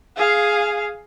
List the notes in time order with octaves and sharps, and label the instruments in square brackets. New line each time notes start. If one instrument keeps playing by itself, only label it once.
[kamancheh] G#4 F5